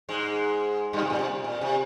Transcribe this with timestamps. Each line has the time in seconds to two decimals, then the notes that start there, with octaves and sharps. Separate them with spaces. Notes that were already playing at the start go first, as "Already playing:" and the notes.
0.09 G#2 G#3
0.93 G2 G3
1.02 C3
1.10 A#2
1.19 C3
1.44 A#2
1.61 C3